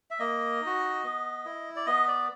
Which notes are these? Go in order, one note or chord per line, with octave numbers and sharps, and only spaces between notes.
E5
A#3 D#5
D#4
F#4
B3
E4
D5
B3 D#5
D5